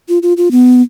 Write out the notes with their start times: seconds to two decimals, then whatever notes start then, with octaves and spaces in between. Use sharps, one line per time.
0.09 F4
0.23 F4
0.37 F4
0.51 B3